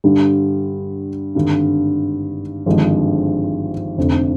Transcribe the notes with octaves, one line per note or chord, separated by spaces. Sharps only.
G2 D3 G3
G#1 G2 D3
G#1 G2 D3 F3 G#3
F1 F2 D3